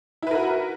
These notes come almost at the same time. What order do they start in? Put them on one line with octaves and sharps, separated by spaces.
E4 B4 A#4 F#4